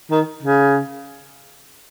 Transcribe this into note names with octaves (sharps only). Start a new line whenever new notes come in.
D#3
C#3